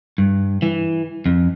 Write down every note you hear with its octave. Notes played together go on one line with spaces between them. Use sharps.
G2
E3
F2